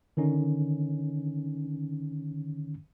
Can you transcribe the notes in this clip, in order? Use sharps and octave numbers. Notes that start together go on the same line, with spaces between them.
D3 D#3 C#4 D#4